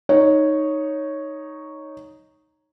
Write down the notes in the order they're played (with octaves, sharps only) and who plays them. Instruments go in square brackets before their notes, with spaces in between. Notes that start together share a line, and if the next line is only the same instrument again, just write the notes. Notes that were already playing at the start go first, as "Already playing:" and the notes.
[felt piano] D#4 C#5